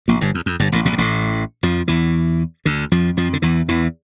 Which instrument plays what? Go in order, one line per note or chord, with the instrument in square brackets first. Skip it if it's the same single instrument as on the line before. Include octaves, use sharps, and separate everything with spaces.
[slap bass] A#1 A#2
G1 G2
E2
F2
G1 G2
A1 A2
A#1 A#2
G2
A1 A2
F2 F3
E2 E3
D2 D3
F2 F3
F2 F3
D3
E2 E3
E2 E3